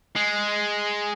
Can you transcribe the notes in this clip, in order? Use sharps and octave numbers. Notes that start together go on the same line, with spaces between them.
G#3